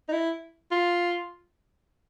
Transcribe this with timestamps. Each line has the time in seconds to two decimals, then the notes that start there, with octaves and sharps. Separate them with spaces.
0.09 D#4
0.12 E4
0.71 F4